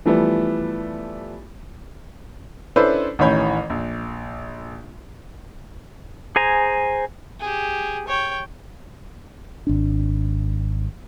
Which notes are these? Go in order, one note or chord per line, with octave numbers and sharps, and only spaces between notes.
E3 F3 G3 A3 B3 E4
C#4 D4 E4 A4 B4 C5
A1 D#3 E3 C#5 B5 G6
A#1
G#4 C5 G#5 A#5
G4 G#4
C#5 G5
G#1 D4